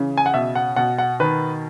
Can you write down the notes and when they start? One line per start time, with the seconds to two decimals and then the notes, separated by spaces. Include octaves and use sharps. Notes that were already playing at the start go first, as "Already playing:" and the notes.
Already playing: C#3 E3
0.18 G#5
0.26 F#5
0.34 B2 E5
0.55 F#5
0.76 B2 F#5
0.98 F#5
1.20 D#3 B4